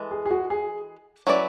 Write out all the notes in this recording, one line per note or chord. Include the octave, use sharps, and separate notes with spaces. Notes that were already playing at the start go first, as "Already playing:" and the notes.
Already playing: E3 G#3 A4
G#4
G#4
F#4
G#4
F#3 C#4 E4 B4 D5